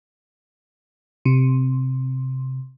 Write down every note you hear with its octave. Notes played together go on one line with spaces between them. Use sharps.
C3